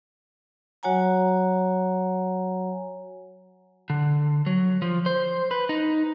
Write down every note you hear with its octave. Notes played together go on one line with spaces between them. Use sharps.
F#3 F#4 C#5 F#5 G#5 A#5
D3
F#3
F3
C5
B4
D#4